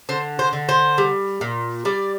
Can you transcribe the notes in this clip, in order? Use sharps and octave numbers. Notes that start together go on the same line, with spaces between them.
D3 C5
C5
D3
C5
G3
A#2
G3 D5